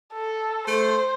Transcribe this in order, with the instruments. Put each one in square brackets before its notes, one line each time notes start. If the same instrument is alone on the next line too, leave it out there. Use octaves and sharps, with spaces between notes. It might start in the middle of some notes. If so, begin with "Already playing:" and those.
[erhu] A4
[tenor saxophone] A3 [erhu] C5